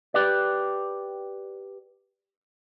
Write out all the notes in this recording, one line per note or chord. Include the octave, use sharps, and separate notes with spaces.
G4 B4 D5